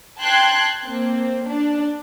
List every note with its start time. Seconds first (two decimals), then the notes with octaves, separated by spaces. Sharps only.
0.21 G5 A5 C6 F#6 G#6
0.84 A#3 C4
1.45 D4